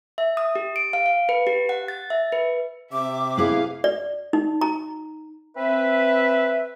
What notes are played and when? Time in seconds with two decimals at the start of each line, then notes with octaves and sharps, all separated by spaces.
0.18 E5
0.37 D#6
0.55 G4
0.76 D7
0.93 F5
1.06 F5
1.29 B4
1.47 G4
1.69 F#5
1.88 A6
2.10 E5
2.32 B4
2.92 C3 E5 D6
3.37 B3 E4 G#4 F5
3.84 D5
4.33 D#4
4.61 A#5
5.57 C4 B4 E5